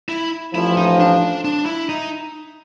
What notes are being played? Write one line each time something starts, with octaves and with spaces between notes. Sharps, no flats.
E4
A1 A2 F3 E4
D#4
D4
D4
E4
D#4